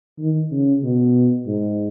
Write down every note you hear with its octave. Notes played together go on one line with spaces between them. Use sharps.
D#3
C#3
B2
G#2